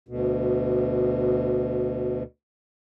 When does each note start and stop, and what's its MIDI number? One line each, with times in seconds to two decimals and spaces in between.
0.09 2.23 38
0.09 2.23 47